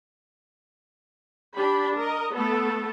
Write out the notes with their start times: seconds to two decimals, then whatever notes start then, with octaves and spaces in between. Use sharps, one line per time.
1.55 D4 G4 B5
1.96 A#4 D#5
2.34 A3 B3 A4